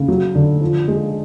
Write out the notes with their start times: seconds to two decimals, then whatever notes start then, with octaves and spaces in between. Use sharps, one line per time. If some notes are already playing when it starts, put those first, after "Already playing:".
Already playing: C#3
0.08 F#3
0.35 D3
0.61 F3
0.88 G#3